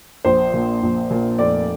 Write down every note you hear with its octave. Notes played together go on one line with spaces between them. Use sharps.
A#1 C5
A#2
A#1
A#2
F1 D5